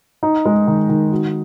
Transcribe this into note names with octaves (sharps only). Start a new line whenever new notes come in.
D#4
G#3
D#3
D#3
F#4